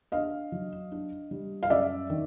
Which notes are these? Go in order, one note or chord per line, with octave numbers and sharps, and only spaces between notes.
D4 D#5 F5
F#3
D4
G3
F5
F#2 D5 E5
D#3